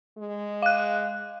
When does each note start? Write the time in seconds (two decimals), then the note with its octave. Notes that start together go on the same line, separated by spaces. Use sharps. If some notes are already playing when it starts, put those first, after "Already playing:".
0.18 G#3
0.62 F5 F#6